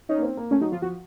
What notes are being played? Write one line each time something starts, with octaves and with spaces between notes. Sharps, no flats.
C#4 D#4
A#3
C4
A#3
A3 C#4
F#3 D#4
F3 F4
F3 F#4